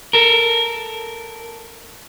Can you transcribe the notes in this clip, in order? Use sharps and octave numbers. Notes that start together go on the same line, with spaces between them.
A4 A#4